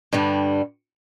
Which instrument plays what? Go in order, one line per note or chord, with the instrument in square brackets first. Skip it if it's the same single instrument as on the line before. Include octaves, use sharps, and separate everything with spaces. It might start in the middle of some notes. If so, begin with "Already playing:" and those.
[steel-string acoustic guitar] G2 D3 G3